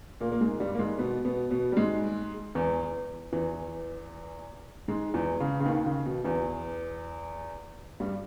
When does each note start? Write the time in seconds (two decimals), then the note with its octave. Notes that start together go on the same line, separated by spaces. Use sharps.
0.21 A#2 A#3
0.32 A#3
0.41 G#2 G#3
0.60 G2 G3
0.75 A#3
0.79 G#2 G#3
0.99 B2 B3
1.25 B2 B3
1.51 B2 B3
1.72 G3
1.77 G#2 G#3
2.55 E2 E3
3.33 E2 E3
4.88 G#2 G#3
5.14 E2 E3
5.40 C#3
5.60 C#3
5.66 D#2 D#3
5.86 C#3
6.06 B2
6.24 E2 E3
8.00 G2 G3